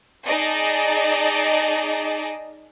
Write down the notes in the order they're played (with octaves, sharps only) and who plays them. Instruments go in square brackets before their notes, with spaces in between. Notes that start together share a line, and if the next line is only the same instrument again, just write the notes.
[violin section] D#4 G#4 D5 D#5 A5